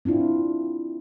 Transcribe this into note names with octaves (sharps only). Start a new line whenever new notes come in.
C4 D4 E4 F4